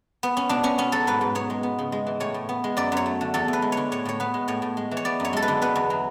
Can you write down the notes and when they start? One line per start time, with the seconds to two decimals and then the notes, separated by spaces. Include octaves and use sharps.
0.23 B3
0.37 C#4
0.49 B2 D4
0.63 B2 C#4
0.78 B3 C#4
0.92 F#3 A4
1.07 G#2 B4
1.21 G#2
1.35 B3 C#5
1.50 G#3
1.63 B3
1.79 C#3
1.92 G#3
2.07 E3
2.20 A2 C#5
2.34 A2
2.49 B3
2.64 G#3
2.77 F#2 D5
2.92 F#2 C#5
3.06 A3
3.21 D3
3.34 E2 A4
3.48 E2 B4
3.62 G#3
3.72 D3 C#5
3.92 A2 C#5
4.05 A2 C#5
4.20 B3 B4
4.34 G#3
4.48 A2 C#5
4.62 A2
4.77 G#3
4.91 E3
4.97 C#5
5.05 B3 D5
5.20 F#2 C#5
5.33 G#3 A4
5.42 B4
5.48 D3
5.62 B3 B4
5.76 E2
5.90 F#3